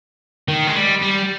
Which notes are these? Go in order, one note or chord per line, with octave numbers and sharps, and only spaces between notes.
D#3
G#3
G3
G3